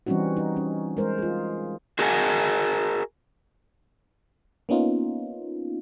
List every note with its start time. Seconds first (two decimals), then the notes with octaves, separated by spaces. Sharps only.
0.06 E3 G3 C4 C#4 D#4 F#4
0.37 D#4
0.56 C#4
0.97 G#3 A#4 C5
1.18 F4 G#4
1.99 F#4 G#4 A#4 D#5 F#5 G#5
4.69 A#3 B3 C#4 D#4 F4